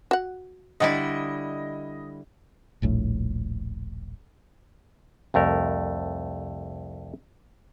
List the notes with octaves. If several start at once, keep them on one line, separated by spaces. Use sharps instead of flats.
F#4 F#5
D3 G3 E4 D#5
D#1 A#1 A2
C2 F2 A3 A#4